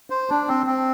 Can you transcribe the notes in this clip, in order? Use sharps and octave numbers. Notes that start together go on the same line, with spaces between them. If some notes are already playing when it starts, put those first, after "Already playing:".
C5
D4
C4
C4